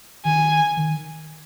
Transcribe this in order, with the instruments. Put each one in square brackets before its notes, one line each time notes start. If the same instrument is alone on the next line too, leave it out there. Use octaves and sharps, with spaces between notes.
[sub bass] D#3 [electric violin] G#5
[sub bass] D#3